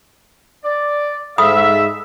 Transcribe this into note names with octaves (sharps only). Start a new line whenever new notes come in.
D5
G#2 A4 E5 F5 B5 D#6